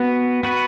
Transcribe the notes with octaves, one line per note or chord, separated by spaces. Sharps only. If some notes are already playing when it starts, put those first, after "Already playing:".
Already playing: B3 F#4 B4
B3 F#4 B4